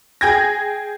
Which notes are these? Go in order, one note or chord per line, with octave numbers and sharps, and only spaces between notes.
G#4 G5 G#6 A#6